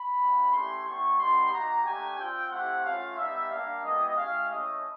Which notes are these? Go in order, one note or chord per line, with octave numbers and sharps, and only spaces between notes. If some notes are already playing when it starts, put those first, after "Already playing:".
Already playing: B5
G3 A#3 D4
A3 C#4 E4 G4 C6
G3 B3 E4 G4 C#6
G3 B3 D#4 G4 C6
A#3 D#4 F#4 A#5
A3 D4 G4 G#5
C4 F4 G5
A3 C4 E4 G4 F#5
A3 C#4 F4 F5
G3 B3 D#4 G4 E5
G3 A#3 D4 F5
G#3 B3 E4 G4 D#5
G#3 C#4 E4 G4 F5
A3 C#4 E4 D#5